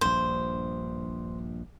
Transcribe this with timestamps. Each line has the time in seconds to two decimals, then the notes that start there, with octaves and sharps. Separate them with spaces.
0.01 A#1 G2 C5